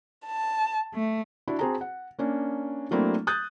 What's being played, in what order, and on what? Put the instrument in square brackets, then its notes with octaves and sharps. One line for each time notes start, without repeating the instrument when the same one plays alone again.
[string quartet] A5
A3
[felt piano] D4 E4 F#4
C4 F#4 G#4 C5 A5 A#5
F#5
A#3 C#4 D4
F#3 A3 A#3 C4 D4 E4
D#6 F#6 G6 A6